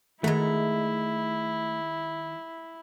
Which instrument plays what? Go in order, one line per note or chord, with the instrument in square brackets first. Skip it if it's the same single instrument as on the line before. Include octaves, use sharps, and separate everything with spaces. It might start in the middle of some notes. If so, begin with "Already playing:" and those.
[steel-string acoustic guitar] D#3 A#5 [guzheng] G#3 F#4 [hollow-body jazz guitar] A3 [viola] E4